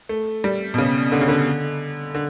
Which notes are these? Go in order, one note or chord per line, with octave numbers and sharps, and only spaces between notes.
A3
G3
B2
C#3
D3
C#3
D3
D3